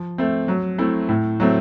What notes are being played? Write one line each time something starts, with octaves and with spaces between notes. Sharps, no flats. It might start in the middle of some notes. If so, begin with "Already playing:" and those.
Already playing: F3
A3 C4
F#3
A3 C4 E4
A2
F#3 A3 C4